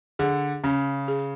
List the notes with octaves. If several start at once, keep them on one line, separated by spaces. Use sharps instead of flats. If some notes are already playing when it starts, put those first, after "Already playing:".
D3 G#4
C#3 C#4
G#4